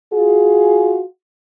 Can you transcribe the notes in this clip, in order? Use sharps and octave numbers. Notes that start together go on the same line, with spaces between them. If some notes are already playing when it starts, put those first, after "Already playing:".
F4 F#4 G#4